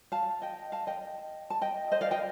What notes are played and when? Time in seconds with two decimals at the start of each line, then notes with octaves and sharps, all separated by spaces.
0.12 F5 A5
0.42 D#5 G5
0.72 F5 A5
0.87 D#5 G5
1.50 A5
1.61 D#5 G5
1.92 C5 D#5
2.01 D5 F5
2.11 D#5 G5